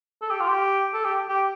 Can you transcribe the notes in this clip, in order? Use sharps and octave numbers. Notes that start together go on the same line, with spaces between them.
A4
G4
F4
G4
A4
G4
G4